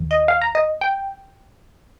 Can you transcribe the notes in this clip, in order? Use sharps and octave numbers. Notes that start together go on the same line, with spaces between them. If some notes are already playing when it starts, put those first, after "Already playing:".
Already playing: D#2 D#3
D#5
F5
A#5
D#5
G5